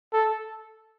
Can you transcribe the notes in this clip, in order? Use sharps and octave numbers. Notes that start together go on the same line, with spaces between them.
A4